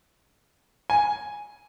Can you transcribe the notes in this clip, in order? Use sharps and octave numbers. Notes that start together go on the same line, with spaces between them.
G#5